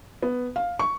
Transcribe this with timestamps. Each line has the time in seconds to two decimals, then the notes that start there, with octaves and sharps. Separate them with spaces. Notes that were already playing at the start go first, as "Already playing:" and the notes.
0.23 B3
0.56 F5
0.79 C#6